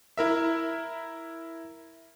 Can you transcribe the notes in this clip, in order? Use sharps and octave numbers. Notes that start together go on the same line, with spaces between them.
E4 A#4 E5